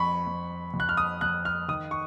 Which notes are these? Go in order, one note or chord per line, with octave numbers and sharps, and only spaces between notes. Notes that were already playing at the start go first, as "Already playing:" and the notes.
Already playing: F2 B5 C#6
F2
F2
F#6
F6
D#6
F2 F#6
F6
D#3 D#6
C#6